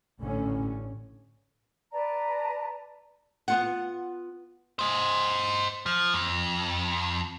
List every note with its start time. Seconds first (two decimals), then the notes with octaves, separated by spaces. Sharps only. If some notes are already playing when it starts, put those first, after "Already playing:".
0.20 A1 A2 D3 C#4
1.92 B4 D5 A5 A#5
3.48 B3 F4 F#5
4.79 C5 D#5
5.86 F3
6.14 F2